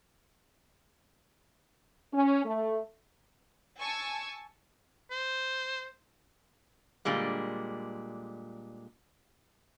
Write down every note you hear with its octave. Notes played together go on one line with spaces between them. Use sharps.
C#4
A3
G#5 A5 C#6 E6 G#6
C5
A#2 D3 G3 G#3